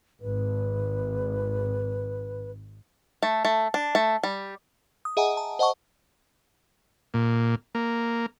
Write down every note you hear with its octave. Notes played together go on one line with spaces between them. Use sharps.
G#1 B4
A3
A3
D4
A3
G3
D#6
G#4 D#5 E5 F#5 G#5 A#5
A5
C5 D#5 F#5 A5 C#6
A#2
A#3